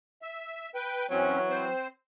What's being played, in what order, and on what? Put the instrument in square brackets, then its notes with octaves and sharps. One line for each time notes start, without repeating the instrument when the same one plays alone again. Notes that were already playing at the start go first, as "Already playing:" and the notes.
[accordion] E5
B4 G5
[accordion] F#2 C4 C#4 [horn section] E3 F#3
[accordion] C4 C5